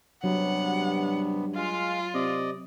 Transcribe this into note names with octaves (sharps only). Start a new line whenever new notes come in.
G2 C3 F#3 B3 F#5
G#3 F4 F5
C3 D5 D#5